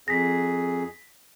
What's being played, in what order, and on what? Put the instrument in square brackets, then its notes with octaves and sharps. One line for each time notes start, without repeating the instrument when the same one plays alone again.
[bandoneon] F2 G#4 [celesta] A#6 B6